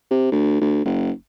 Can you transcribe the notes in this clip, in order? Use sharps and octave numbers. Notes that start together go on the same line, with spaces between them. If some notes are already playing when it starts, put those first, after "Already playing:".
C3
D2
D2
F#1